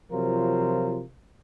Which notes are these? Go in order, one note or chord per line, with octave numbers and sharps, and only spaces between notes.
C3 F3 F#3 F4 A#4 C5